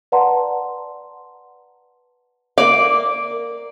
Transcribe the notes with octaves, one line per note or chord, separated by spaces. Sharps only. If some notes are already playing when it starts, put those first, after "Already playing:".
B4 D5 F#5 A5 A#5 C6
A#3 D5 F5